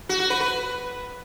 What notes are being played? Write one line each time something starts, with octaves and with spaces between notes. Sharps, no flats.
F#4
F#4
B4
B4